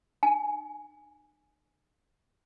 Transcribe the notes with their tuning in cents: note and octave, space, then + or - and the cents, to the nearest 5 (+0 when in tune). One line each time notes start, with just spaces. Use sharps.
D#4 -45 G#5 +0